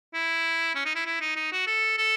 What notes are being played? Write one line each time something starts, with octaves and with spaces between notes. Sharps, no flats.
E4
C#4
D#4
E4
E4
D#4
D#4
F#4
A4
A4